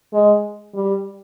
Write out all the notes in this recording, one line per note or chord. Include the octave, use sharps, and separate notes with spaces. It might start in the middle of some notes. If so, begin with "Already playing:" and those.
G#3
G3